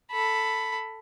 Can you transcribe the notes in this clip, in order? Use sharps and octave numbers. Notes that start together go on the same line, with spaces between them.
A4 B5